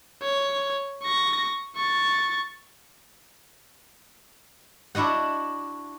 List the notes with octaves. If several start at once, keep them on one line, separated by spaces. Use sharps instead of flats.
C#5
C#6 A#6
C#6 A6
D4 E4 F#4 D#5 F#5